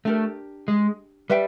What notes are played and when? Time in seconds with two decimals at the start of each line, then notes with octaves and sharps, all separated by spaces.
0.05 A3 D4 G4 A#4
0.68 G#3
1.30 G3 B4 E5 G5